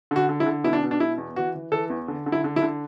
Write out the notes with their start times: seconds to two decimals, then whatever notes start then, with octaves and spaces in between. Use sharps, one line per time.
0.11 D3 F#4
0.29 D3
0.40 E4
0.46 D3
0.64 B2 E4
0.73 D4
0.83 B2
0.91 D4
1.00 B2 E4
1.18 E2
1.36 E3 F#4
1.55 E3
1.72 E3 A4
1.90 E2
2.08 D3
2.26 D3
2.32 E4
2.44 D3
2.56 E4
2.62 D3